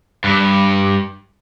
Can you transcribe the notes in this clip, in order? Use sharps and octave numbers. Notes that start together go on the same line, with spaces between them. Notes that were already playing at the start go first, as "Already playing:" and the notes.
G2